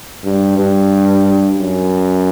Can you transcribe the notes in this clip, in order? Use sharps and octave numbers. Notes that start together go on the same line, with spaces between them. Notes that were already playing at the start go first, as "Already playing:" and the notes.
G2
G2
F#2